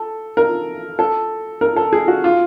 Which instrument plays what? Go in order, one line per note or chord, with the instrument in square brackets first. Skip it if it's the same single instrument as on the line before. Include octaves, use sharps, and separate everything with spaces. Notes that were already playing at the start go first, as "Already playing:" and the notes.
Already playing: [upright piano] A4
A#4
A4
A#4
A4
G#4
F#4
F4